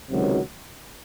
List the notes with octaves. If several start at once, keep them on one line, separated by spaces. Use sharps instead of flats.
C#2 C3 D#3 F#3